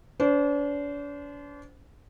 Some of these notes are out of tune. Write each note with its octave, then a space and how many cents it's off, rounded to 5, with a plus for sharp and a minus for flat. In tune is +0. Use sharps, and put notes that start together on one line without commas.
D4 -40 C5 -25